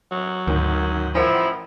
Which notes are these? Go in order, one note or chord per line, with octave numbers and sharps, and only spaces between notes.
F#3
D2 G#2 D#3
A1 F3 E4 A#4 F#5